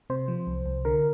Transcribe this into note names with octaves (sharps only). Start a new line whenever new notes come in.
C3 C5
F3
C2
C2
D3 A#4